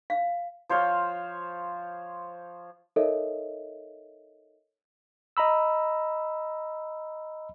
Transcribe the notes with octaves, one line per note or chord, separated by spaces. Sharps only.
F5
F3 C5 C#5 F5
D#4 A4 A#4 C#5 D#5 E5
D#5 A#5 B5 E6